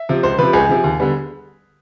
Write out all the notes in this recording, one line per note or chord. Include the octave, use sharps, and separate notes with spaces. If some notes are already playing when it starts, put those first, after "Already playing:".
Already playing: E5
C3 F3
C#2 C5
C3 F3 B4
C#2 G#4
C3 F3
D#2
D3 G3 B3